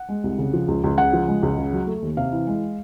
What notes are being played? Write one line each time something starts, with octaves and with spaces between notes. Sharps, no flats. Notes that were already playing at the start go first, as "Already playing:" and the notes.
Already playing: F#5
G#3
C2
C#3
F3
C#2
C#2
C#3 F#5
F3
G#3
C#2
C#3
F#3
A3
D#2
C3 F5
E3
G#3